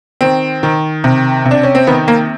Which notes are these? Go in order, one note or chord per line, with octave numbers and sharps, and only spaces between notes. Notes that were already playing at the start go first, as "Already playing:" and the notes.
D#3 C4
D#3
C3
C3
D4
C#4
C4
D#3 B3
A#3